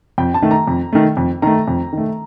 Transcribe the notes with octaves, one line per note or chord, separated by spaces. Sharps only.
F2 G5
A5
D#3 A3
A#5
F2
D#3 A3
F2
D#3 A3 A#5
F2
D#3 A3